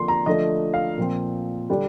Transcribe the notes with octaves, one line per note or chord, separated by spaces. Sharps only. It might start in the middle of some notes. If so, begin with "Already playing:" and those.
Already playing: D3 F3 A#3 D4 C6
A#5
D3 F3 A3 D4 D#5
F5
A#2 F3 C4
D3 G3 D4